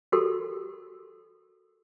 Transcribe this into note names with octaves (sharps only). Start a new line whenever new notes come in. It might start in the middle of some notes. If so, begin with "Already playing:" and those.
F#4 G4 A4 A#4 C6